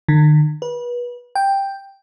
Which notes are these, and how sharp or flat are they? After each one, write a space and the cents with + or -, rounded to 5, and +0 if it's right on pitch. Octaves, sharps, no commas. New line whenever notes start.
D#3 -45
B4 -30
G5 +5